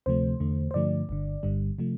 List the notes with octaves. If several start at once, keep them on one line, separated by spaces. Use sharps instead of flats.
D2 C3 F3 A3 C5
E2 D3 A3
C5
G2 D3 F3 A3 D5
G1 G2 D3
G1 G2 D3 G3
C3 F3 A3